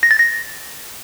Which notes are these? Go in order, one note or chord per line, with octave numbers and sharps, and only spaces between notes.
A#6
A6
A#6